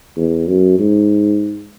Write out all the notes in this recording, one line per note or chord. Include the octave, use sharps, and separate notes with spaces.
E2
F#2
G#2